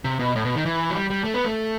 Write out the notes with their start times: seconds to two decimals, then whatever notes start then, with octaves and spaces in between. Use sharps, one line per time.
0.04 C3
0.19 B2
0.36 A2
0.45 B2
0.56 D#3
0.65 E3
0.90 F#3
0.95 G3
1.10 G3
1.24 A3
1.34 B3
1.45 A3